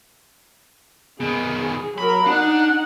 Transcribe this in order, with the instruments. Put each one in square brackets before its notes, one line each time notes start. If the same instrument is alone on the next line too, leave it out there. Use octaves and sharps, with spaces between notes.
[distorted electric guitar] B2 D#3 [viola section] G#4
[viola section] F#3 A#4 [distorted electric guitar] B5
[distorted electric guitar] D4 [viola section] D#4 F#5